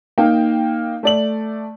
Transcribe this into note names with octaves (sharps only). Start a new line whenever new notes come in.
A#3 D#4 F5 G5
A3 D5 F#7